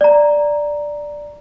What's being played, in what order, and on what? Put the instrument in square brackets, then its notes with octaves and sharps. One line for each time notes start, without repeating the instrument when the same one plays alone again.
[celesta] D5 A#5